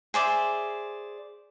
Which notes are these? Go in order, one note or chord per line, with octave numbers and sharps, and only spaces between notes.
G#4 C5 D5 E5